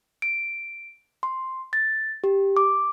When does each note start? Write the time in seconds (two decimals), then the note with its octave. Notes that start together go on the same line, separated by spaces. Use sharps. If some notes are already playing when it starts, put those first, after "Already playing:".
0.22 D7
1.23 C6
1.73 A6
2.24 G4
2.57 D6